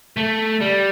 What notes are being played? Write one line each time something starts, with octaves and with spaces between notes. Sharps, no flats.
A3
G3